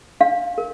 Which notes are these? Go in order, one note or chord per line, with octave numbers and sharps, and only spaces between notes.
D4 F5
A#4